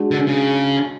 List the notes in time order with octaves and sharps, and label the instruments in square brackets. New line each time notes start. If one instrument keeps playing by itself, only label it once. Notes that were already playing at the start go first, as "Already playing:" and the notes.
Already playing: [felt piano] G#3 D4 F#4
[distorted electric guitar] D3
C#3